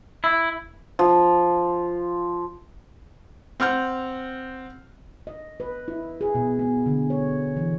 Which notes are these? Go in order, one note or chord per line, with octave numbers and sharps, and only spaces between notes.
E4
F3
C4 F#5 F6 G6
D#5
B4
E4
G#4
B2
B3
D3
C#5
E3